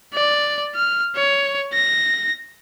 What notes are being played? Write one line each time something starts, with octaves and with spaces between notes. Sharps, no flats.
D5
F6
C#5
A#6